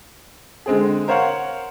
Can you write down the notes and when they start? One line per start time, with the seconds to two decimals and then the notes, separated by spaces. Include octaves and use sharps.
0.66 D3 G#3 C4 G#4
1.08 A#4 C5 C#5 F5 F#5